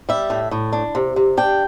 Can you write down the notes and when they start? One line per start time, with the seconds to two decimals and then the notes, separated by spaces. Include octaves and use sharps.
0.09 G3 E5
0.30 A2
0.51 A2
0.73 D4
0.95 C3
1.16 C3
1.37 D4 G5